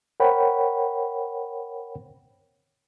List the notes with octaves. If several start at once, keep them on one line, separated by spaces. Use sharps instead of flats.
A#4 C5 C#5 F#5 G5 B5